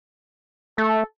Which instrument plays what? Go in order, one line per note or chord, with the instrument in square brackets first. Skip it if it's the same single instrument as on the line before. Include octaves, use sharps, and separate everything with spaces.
[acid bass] A3 [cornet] A4